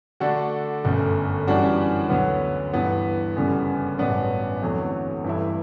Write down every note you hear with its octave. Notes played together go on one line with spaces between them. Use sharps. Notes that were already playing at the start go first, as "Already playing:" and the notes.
D3 A3 D4 F#4 A4
G1 F#2 D3 A3
F#2 E3 G3 D4 F#4
D2 D3 F#3 B3
G2 E3 B3
F#1 F#2 D3 G3 B3
A1 G2 F#3 B3 D4
E2 D3 F#3 A3 C4
G2 E3 A3 E4